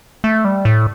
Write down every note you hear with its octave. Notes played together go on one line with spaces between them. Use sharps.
A3
G3
A2